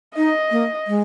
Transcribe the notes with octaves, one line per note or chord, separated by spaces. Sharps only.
D#4 D#5
A#3
G#3